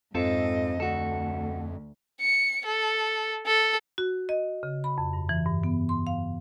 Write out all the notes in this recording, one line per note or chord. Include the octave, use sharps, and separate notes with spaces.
F2 G#2 C4 F4 A4 D#5
D2 F#4 A4
C#7
A4
A4
F#4
D#5
C#3
B5
F2
G2
E3
G2
B3
C6
F5